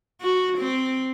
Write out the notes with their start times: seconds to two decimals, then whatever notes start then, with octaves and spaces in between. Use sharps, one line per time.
0.21 F#4
0.58 C4